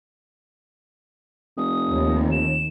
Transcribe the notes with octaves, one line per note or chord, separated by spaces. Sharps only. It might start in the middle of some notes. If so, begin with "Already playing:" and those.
F1 D#6
D#2
E7